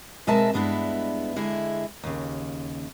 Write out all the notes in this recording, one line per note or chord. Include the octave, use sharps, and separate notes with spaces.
B2 G#3 C4 A#4 E5 A5
G2 G#3 B3 D4 E4
D3 G#3 E4
D#2 C#3